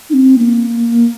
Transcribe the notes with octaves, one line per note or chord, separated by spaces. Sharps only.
D#4
C4
A#3